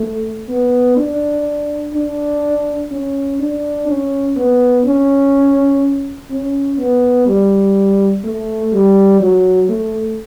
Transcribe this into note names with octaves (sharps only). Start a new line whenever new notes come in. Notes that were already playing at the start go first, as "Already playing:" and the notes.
Already playing: A3
B3
D4
D4
C#4
D4
C#4
B3
C#4
C#4
B3
G3
A3
G3
F#3
A3